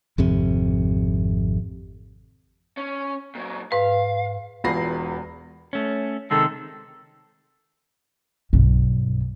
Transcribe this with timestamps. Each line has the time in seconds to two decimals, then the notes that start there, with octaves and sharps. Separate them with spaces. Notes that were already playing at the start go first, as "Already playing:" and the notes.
0.18 G#1 F2 C3
2.77 C#4
3.35 A#2 F#3
3.72 G#2 B4 F5
4.64 E1 E2 F4 B5 A#6 C7
5.73 A3 C#4
6.31 C3 D#3 G#3 A4
8.53 B1 G2